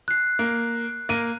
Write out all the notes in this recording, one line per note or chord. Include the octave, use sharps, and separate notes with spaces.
F#6 C7
A#3
A#3 D#7